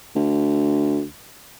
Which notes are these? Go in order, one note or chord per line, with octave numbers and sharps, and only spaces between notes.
D2